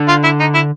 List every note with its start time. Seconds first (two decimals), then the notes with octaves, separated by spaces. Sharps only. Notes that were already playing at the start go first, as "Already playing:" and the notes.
Already playing: D3
0.08 F4
0.24 E4
0.40 D#4
0.54 E4